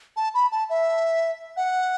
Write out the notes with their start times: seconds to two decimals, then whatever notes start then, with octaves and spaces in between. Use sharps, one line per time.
0.17 A5
0.34 B5
0.52 A5
0.70 E5
1.57 F#5